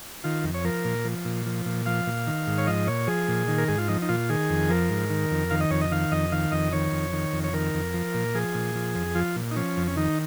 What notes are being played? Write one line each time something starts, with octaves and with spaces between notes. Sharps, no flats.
D#3 F4
F2
C#5
F3 A#4
A#2
F3
A#2
F3
A#2
F3 F5
A#2
D#3
G#2
C#5
F3 D#5
A#2 C#5
F3 G#4
A#2
D#3
A#4
G#2 G#4
F4
F3 D#4
D#4
A#2 F4
D#3 G#4
F2
F3 A#4
G#2
D#3
F2
D#3 F5
D#5
F2 C#5
D#5
D#3 F5
F2 D#5
D#3 F5
F2 D#5
D#3 C#5
F2
D#3
F2
C#5
D#3 A#4
F2
F3
A#2
F3 G#4
A#2
F3
F2
F3 F4
A#2
D#4
F3 C#4
F2
C#4
D#3 D#4